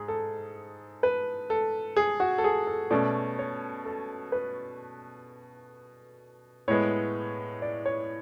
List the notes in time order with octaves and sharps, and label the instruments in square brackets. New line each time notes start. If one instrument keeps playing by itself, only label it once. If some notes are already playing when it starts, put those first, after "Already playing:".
Already playing: [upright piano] G#2 G#4
A4
B4
A4
G#4
F#4
A4
G#4
A4
B2 A3 C#4 D5
C#5
A4
B4
A2 G#3 B3 C#5
D5
C#5